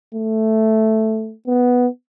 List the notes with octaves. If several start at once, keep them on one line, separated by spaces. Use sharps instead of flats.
A3
B3